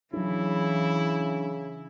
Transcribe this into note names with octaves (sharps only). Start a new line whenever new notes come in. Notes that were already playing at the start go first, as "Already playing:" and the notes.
C#3 E3 F#3 D4 E4